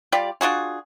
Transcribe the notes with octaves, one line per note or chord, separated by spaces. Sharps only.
G3 F4 G4 D5
D4 F4 F#4 G#4